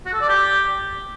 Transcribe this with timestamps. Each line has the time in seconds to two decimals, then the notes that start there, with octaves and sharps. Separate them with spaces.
0.06 F#4
0.13 A4
0.21 D5
0.29 G4